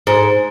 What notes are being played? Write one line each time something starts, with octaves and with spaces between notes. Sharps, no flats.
G#2